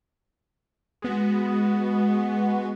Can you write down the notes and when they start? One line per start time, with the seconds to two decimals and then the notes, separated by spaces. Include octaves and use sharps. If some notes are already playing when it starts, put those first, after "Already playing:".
1.02 G#3 B3 F#4